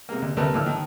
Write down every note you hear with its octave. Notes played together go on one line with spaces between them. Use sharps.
C3 G#3 A#3
D2
D2 C3 A3 A#4 B4
D2 A2 F3 E6 F6
D#3